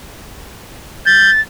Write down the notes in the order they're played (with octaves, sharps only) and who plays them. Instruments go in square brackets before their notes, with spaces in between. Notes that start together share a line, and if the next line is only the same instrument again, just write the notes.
[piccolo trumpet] G6 [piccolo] A6